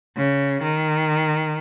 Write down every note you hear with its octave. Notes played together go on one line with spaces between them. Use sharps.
C#3
D#3